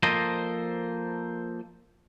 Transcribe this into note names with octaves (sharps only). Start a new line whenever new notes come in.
F3 A#3 A4 C5 D#5